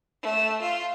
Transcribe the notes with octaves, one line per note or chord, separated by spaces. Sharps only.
A3
F4